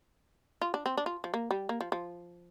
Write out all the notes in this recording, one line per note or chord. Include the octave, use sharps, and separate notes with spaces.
F4
D4
C4
D4
F4
F3
A#3
G3
A#3
F3
F3